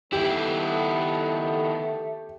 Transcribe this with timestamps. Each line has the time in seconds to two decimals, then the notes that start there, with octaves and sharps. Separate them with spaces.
0.13 D#3 A3 B3 E4 G4 A4